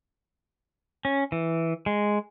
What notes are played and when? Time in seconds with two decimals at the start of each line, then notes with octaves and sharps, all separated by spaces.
1.05 C#4
1.32 E3
1.86 G#3